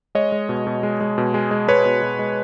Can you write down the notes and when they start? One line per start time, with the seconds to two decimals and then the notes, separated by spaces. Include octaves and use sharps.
0.15 G#3 C#5 D#5
0.32 G#3
0.49 B2
0.67 B2
0.83 G#3
1.00 G#3
1.18 B2
1.34 G#3
1.51 G#3
1.68 G#3 B4 C#5
1.86 B2
2.02 B2
2.19 G#3